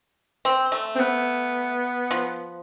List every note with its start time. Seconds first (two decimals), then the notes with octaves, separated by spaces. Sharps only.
0.45 C4
0.72 A3
0.96 C4
1.00 B3
2.11 F3